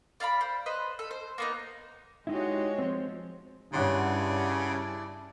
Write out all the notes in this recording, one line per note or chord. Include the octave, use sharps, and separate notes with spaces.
D5 F5 A#5 B5
C5
B4 C5 D#5
A4
C5
A#3 B3 D#4
G#3 D#4 E4 F#4 G4 C#5 D#5
F3 C4 C5
G2 C#3 D4 E4 C#5 D5 F#5 C6